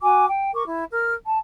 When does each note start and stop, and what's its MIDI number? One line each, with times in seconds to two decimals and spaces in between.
0.02 0.25 66
0.02 0.25 80
0.02 0.25 86
0.29 0.54 79
0.55 0.63 70
0.55 0.63 85
0.55 0.63 86
0.67 0.83 64
0.93 1.14 70
0.93 1.14 89
1.26 1.39 81